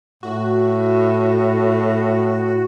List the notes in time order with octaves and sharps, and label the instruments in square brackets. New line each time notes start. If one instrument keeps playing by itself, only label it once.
[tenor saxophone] A2 [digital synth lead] F#4